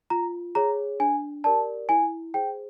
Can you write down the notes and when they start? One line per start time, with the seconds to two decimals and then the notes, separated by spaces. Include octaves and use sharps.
0.10 F4 A#5
0.55 G#4 C#5 A#5
1.00 D4 G#5
1.44 G4 A#4 D5 A5
1.89 E4 G#5
2.34 G#4 C5 G5